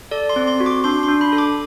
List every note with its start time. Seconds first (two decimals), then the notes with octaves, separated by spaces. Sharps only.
0.11 A4 D5
0.29 C6
0.36 C4
0.47 C6
0.60 F#4
0.66 D6
0.84 D4 C6
1.03 C6
1.09 D4
1.21 B5
1.33 A4
1.38 D6